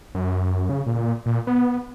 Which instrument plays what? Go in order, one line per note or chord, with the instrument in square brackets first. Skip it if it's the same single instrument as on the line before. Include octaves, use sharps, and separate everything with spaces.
[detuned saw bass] F#2
C#3
A#2
A#2
B3